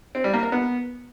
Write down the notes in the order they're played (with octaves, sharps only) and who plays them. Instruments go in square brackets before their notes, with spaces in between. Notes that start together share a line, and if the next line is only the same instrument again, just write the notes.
[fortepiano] C4
G3
A#3
A#4
B3